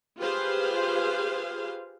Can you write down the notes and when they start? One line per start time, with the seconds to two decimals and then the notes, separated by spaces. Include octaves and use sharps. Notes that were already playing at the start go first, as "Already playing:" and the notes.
0.18 F4 G4 G#4 B4 C5 F5